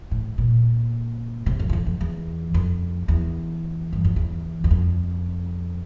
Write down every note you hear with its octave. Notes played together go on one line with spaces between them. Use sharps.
A2
A#2
C3
F2
E2
F2
F2
E2
F2
E2
G2
F2
E2
E2
F2